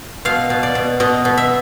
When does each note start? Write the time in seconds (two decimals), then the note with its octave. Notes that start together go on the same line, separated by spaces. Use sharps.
0.25 B2 F5
0.50 B2
0.63 D5
0.75 B2
1.00 B2 D#5
1.25 B2
1.37 E5